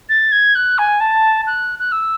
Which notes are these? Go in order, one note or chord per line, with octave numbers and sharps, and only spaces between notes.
A6
G#6
F#6
G#5
A5
F#6
F#6
E6